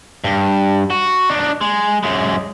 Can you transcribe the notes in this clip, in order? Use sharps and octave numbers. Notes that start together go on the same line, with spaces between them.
G2
F#4
D4 D#4
G#3
F#2 G#3